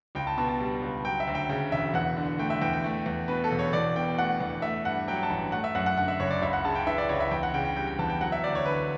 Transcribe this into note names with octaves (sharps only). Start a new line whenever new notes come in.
C#2 G5
A5
B2 A5
A5
G3
C#2
F#3 G5
E5
D2
G5
C#3 G5
E1 E5
E2 F#5
D3
A3 G5
E5
E2 G5
G5
A3
E2
B2 B4
A4
E1
C#5
E2 D5
B2 G5
A3 F#5
E2
A3 E5
G2 F#5
F#3 G5
A5
A1
A3 F#5
E5
F#2 F#5
F#5
D3 F#5
E5
F#1 C#5
D5
C#2 E5
F#5
C#3 A5
G5
E3 E5
D5
C#2 C#5
E5
E2 G5
F#5
C#3 G5
G5
G3 G5
G5
E2 A5
G5
F#3 F#5
E5
D2 D5
C#5
D3 B4